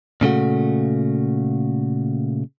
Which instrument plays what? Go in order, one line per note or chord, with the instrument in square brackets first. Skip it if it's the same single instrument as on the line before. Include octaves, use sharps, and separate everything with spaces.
[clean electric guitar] A#2 C#3 A3 F#4